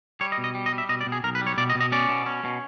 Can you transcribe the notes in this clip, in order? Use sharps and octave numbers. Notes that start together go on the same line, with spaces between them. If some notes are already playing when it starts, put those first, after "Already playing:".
G3 C#5
D#5
B2
D#5
G3
D#5
G3
E5
B2 D#5
D5
B2
G#4
B1 A#4
B4
G3
C#5
B2 D5
D#5
B2
D#5
C#4 D5
B2
C#4
B2